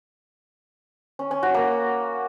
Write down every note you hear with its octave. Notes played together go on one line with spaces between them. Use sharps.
C#4
C#4
F#4
A#3